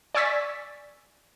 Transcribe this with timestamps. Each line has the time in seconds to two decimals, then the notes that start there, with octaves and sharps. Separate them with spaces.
0.15 D5 G#5 C#6 E6 A6 B6